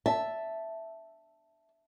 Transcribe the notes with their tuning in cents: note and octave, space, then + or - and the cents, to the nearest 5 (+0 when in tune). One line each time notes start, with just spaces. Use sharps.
E5 +0 A5 +0